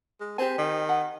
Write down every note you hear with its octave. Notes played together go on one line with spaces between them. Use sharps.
G#3
C4 G4 C5 G#5
D#3
F#5